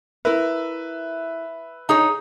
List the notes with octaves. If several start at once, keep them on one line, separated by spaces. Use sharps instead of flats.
E4 A#4 B4 E5
D#4 G#4 C#5 A#5 D#6